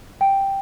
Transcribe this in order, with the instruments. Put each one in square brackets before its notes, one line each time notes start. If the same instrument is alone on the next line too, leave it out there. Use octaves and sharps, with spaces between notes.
[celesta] G5